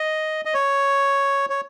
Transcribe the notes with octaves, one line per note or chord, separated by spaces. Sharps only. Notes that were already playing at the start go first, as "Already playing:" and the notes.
Already playing: D#5
D#5
C#5
C#5